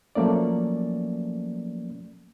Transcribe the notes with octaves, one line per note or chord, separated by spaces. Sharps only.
F3 F#3 A3 A#3 C#4 D5